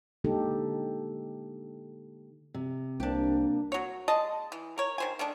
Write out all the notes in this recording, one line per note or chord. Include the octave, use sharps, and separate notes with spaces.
D3 G#3 A#3 D#4 G4 A4
C3
C2 A#3 D4 G4
F#3 C#5
G#3 D#5 A5
E3
A#4 C#5
D#3 C5 G#5
D#3 A3 D4